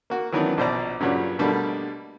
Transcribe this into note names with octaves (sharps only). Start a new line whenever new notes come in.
A#3 F#4
D#3 E3 F#3 B3 C#4 D4
A#1 B2 C5 D5 A#5
G2 A#2 C#3 F#3 G3
B2 D3 G3 A3 A#3 D4